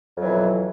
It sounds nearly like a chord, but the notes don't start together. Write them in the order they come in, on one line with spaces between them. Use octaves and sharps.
F2 F#3 E3 B2